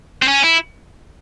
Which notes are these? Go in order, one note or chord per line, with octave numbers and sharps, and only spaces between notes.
C4
C#4
E4